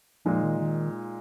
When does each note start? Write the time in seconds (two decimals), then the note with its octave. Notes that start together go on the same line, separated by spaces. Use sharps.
0.25 A#2 F3 G#3 D#4
0.43 D#3
0.60 D#3